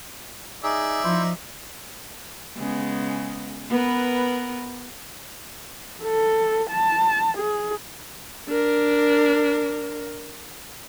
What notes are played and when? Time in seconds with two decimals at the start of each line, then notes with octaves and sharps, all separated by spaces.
0.64 D#4 G#4 D5 E5
1.03 F3 D#4 E4 C5
2.56 C#3 G#3 B3
3.69 B3 A#4 B4
6.03 A4
6.70 A5
7.38 G#4
8.48 D4 A#4